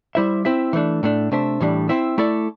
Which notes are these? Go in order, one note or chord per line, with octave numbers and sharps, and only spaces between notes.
G3 E4 C5 E5
C4 E4 C5 E5
E3 A3 D4
A2 A3 D4
C3 A3 D4 C5 E5
A2 E3 G3 D4
C4 E4 C5 E5
A3 E4 A4 D5